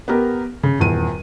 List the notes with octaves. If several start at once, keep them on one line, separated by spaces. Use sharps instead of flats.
B3 G4 A#4
C#3
D#1 E2 D#7